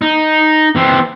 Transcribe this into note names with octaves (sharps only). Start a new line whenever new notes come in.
D#4
E3 C4